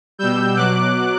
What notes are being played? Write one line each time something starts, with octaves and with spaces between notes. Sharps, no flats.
B2 G3 E6 G6
B2 F#3 D6 F#6